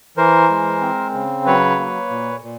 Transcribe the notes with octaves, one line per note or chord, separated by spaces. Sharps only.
E3 A#4 C5
G#3
C4
C#3
F#3 B4 C#5
A#3
A#2
A#2